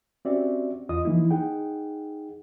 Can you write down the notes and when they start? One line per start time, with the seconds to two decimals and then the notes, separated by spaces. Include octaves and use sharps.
0.25 C4 C#4 F#4 G4 D5 E5
0.89 E2 F4 D#5 D#6
1.05 E3 F3 A#3 D#4 E4
1.31 D#4 G#4 F#5 G5